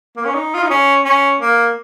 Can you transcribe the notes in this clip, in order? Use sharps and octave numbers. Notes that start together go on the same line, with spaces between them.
A#3
C#4
D#4
F4
D#4
C#4
C#4
A#3